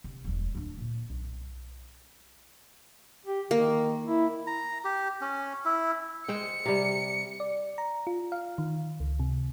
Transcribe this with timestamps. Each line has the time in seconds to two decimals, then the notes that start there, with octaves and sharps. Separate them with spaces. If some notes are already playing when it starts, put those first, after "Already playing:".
0.04 C3
0.24 E1 G3
0.55 D1 D4
0.78 A#2
1.10 B1 F#2
3.26 G4
3.51 D#3 A#3
4.07 E4
4.47 A#5
4.84 G4
5.21 C#4
5.65 E4
6.29 G#3 C5 G5 C#7
6.66 C3 G3
7.40 D5
7.78 A#5
8.07 F4
8.32 F5
8.58 D#3
9.00 C#2
9.20 C3